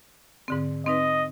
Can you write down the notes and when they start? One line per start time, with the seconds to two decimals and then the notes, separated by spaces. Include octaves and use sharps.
0.48 G#2 D3 C4
0.87 C4 D#4 B4 D#5